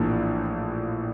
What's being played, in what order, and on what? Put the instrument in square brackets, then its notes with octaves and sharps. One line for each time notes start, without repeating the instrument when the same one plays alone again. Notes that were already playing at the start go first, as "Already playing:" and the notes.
Already playing: [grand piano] A#1 A2 E3 A#3 D4